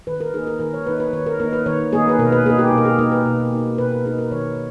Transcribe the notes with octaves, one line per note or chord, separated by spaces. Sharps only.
D#3 B4
A#4
A#3 D#4 G#4
A#4
D#3 A#4
C#5
A#3 D#4 B4
B4
D#3 C#5
A#4
A#3 D#4 A#4
B4
D#3 C#5
A#3 D#4 G#4
B4
B2 A#4
B4
A#3 D#4 G#4
G4
B2
A#4
G#4
A#3 D#4 A#4
B4
B2
A#3 D#4
B2 B4
A#4
A#3 D#4 G#4
A#4
D#3 C#5